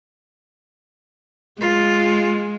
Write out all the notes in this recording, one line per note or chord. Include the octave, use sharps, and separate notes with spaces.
G#3 F4